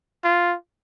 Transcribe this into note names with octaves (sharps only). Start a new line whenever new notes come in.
F4